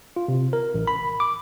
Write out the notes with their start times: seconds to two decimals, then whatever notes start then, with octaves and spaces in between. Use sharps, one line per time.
0.16 F4
0.28 C3
0.53 A#4
0.74 A1
0.87 B5
1.20 D6